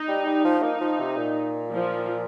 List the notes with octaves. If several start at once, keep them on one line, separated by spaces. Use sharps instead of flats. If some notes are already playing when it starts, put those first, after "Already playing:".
Already playing: D#4
G3
G3
F3
A#3 D#4
F3
C3
A#2
F3